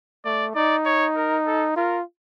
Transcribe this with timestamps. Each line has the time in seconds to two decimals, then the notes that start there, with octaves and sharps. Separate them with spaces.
0.25 A3 D5
0.55 D#4 D5
0.86 C#5
1.16 A#4
1.47 A4
1.76 F4 A#4